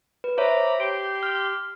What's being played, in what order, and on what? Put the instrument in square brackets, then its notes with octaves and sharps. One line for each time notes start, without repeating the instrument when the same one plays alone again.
[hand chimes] B4
[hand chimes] C5 C#5 E5 [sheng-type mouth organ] A#5 B5 D6
[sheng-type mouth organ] G4 C6 G6 [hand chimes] D7
[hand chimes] F6